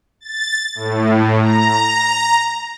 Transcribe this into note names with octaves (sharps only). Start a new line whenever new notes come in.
A6
A2
A#5